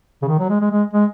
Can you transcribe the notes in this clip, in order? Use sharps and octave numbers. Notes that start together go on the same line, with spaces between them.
C#3
D#3
F#3
G#3
G#3
G#3
G#3